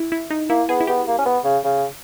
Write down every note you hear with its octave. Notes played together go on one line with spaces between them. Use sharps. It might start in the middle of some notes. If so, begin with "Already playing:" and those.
Already playing: E4
E4
D#4
A#3 E4
B3 G#4
E4
B3 G4
A#3
C#4
B3
C#3
C#3